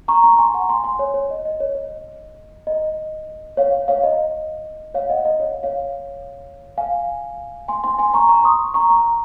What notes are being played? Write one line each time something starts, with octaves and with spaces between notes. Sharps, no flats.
A#5 C#6
A#5 C#6
G#5 C6
F#5 A#5
G#5 C6
G#5 C6
C#5
C#5
D#5
D#5
C#5
D#5
D#5
C#5 F5
C#5 F5
D#5
C#5 F5
D#5 F#5
D#5
C#5 F5
C#5 F5
F5 G#5
G#5 C6
G#5 C6
G#5 C6
A#5 C#6
A#5 C#6
C6 D#6
A#5 C#6
A#5 C#6